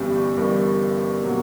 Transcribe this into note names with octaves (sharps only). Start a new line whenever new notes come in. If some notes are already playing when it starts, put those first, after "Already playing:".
Already playing: G1 G2 E3 G3 B3 C#4 G4
G4
G1 G2 E3 G3 A#4
B2 F#3 A#3 D4